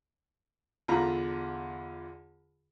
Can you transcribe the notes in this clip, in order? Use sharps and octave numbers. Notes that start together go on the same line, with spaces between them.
E2 D3 F4 A#5 B5